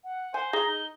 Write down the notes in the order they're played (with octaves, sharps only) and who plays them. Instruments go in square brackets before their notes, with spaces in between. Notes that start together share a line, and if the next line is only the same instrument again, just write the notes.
[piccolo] F#5
[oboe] C5 [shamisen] G#5
[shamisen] G#4 [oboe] A#5 [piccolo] G7
[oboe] D#4